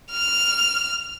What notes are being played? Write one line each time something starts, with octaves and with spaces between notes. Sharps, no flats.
F6